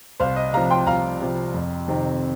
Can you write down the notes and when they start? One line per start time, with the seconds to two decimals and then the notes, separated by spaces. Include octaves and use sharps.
0.20 C2 C5 F5
0.36 D#5
0.53 C3 F3 F5 A#5
0.70 G5 C6
0.86 C2 F5 A#5
1.20 C3 F3
1.54 F2
1.88 C3 D#3 C4